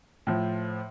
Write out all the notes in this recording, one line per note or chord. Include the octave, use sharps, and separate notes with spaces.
A2 F3